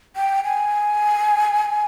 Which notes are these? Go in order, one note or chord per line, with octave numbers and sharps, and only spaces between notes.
G5
G#5